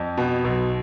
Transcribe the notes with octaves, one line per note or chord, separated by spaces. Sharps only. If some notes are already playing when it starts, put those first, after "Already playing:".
Already playing: F2
B2
B1